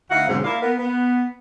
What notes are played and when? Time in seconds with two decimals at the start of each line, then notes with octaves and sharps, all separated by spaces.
0.10 D2 D#4 E4 F5 F#5
0.28 G#2 B2 D3 F#3 C4 G#4
0.44 A#3 E4 D5 F5
0.62 B3 A#4
0.79 B3